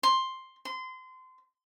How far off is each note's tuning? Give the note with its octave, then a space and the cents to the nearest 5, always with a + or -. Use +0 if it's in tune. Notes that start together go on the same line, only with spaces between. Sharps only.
C6 +5
C6 -25